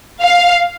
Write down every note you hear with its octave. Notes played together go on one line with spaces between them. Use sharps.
F5